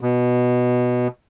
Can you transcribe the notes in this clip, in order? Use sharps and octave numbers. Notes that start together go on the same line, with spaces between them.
B2